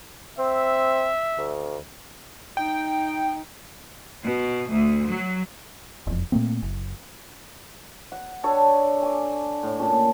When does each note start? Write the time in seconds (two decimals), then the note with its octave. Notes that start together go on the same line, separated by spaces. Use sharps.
0.38 C4 E5
1.38 D2
2.57 D#4 G5
4.24 B2
4.70 D2
5.09 F#3
6.07 E1 F2
6.32 A#2 A3 A#3 C4
6.62 F#1
8.12 F#5
8.43 D4 A4 C#5 G5
9.02 G#5 D6
9.63 A2
9.79 A#2 C#4 G5 A5